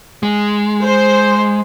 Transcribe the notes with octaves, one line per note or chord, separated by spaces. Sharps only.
G#3
C5